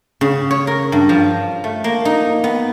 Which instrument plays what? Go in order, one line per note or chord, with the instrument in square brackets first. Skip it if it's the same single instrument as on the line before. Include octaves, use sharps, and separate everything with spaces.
[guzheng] C#3
C#5
A#4
G2
F3
A3
A#3
D#4
B3